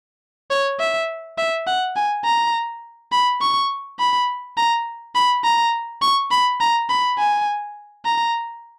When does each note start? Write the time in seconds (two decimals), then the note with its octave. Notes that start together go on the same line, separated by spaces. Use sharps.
0.51 C#5
0.80 E5
1.38 E5
1.67 F#5
1.96 G#5
2.25 A#5
3.12 B5
3.41 C#6
3.99 B5
4.57 A#5
5.15 B5
5.44 A#5
6.02 C#6
6.31 B5
6.60 A#5
6.90 B5
7.18 G#5
8.05 A#5